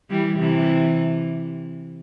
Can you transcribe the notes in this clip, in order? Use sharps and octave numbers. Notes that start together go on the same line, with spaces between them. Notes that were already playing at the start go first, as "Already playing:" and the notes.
E3 G3
C3 E3